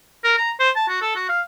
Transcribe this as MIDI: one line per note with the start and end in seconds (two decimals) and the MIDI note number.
0.24 0.36 70
0.38 0.51 82
0.60 0.70 72
0.76 0.88 81
0.88 0.99 66
1.02 1.12 69
1.16 1.29 66
1.29 1.41 77